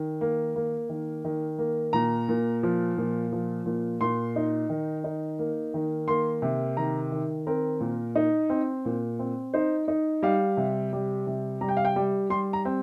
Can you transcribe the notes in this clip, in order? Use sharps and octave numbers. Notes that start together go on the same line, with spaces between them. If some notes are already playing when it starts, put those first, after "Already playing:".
Already playing: D#3
A#3
A#3
D#3
D#3
A#3
A#2 A#5
A#2
F3
A#2
F3
A#2
A#2 C6
D#4
D#3
D#4
A#3
D#3
A#3 C6
C3
D#3 A#5
D#3
C4 A#4
A#2
D#4
C4
A#2
C4
D#4 C5
D#4
G3 F5
C3
G3
C3
G3 A#5
G5
F5
G5
G3
G3 C6
A#5
C4